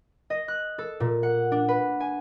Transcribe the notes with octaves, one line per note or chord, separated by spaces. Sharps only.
D#5
F#6
A4
A#2
F#5
D4
B4
G#5